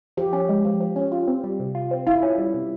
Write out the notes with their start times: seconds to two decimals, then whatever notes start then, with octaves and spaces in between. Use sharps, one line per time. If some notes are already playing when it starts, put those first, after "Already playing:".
0.17 F3 G4
0.33 C#4
0.49 G#3
0.65 F3
0.80 F3
0.96 C#4
1.12 F4
1.27 C4
1.44 G3
1.60 C3
1.75 F4
1.91 C4
2.07 E4 F4
2.23 C#4
2.38 G3
2.54 C3